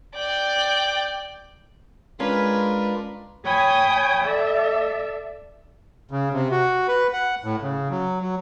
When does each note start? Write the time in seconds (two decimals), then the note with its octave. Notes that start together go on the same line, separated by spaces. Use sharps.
0.15 D5 G5
2.20 G#3 C#4 D4 F4 A#4 B4 F5
3.45 C#5 G5 G#5 B5 D#6
4.24 A4 D5 E5
6.11 C#3
6.33 C3
6.51 F#4
6.88 B4
7.13 F#5
7.44 A2
7.62 C#3
7.91 F#3
8.22 F#3